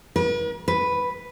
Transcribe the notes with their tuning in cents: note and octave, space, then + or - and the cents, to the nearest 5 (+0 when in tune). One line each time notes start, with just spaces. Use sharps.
B4 -45
B4 +0